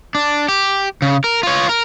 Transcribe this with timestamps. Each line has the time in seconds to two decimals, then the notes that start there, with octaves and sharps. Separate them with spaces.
0.15 D4
0.48 G4
1.02 C#3
1.24 A#4
1.43 F4 C#5
1.69 A#4